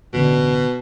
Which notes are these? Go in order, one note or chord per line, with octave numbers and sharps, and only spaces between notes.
A1 B2 D3